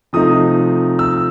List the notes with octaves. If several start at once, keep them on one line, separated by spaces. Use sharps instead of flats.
C3 F3 A3 C4 D#4 D#6
E6